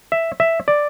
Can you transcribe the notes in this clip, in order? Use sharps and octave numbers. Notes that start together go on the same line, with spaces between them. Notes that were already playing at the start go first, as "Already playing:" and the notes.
E5
E5
D5